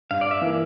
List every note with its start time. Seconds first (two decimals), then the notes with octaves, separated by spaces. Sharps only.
0.11 G2 F5
0.21 D5
0.31 E5
0.41 E3 A#3